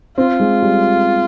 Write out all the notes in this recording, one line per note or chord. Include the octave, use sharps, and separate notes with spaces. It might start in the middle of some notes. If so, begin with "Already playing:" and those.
C4 F4
G#3
G3